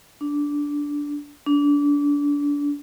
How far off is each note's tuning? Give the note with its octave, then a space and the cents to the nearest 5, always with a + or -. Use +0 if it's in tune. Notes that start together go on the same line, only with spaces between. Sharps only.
D4 -10
D4 -25